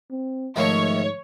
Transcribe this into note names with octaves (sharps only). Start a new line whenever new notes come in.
C4
G#2 D#3 F3 A3 C#5